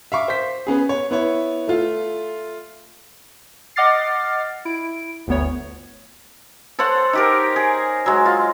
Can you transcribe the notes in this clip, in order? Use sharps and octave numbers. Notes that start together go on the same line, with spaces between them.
E5 F5 C#6 D6
C5 B6
B3 C#4 G#4
C#5
B3 E4 C#5
A3 F4
D#5 F#5 D6 F6 A6 C7
E4 D7
G1 D2 B3 C#5
A4 C5 C#5 F#5
D#4 G4 A#4
G#4
F#3 G#3
F4